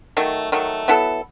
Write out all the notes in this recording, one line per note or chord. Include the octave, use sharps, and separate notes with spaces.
D#3 F#3 A3
D#3 F#3 A3
F#3 B3 E4 A4